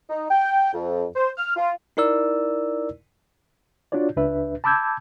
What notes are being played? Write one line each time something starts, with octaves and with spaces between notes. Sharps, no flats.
D#4
G5
F2
C5
F6
F4
D#4 E4 A#4 D5 E6
D4 F4 F#4 C#5 D5
C#2 D4 B4 E5
A5 B5 D6 E6 G6 G#6